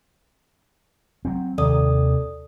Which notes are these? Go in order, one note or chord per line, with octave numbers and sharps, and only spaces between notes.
F#3 C4
D#2 C3 D#3 A4 D5 D#6